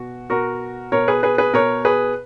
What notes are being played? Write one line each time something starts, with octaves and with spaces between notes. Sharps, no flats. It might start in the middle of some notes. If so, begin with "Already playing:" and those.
Already playing: B2 F#4
B2 F#4 A#4
B2 A#4 C#5
G#4 B4
G#4 B4
G#4 B4
B2 A#4 C#5
G#4 B4